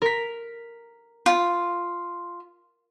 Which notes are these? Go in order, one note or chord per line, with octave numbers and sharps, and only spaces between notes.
A#4 B6
F4